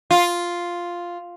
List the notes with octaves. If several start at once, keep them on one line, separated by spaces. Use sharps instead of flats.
F4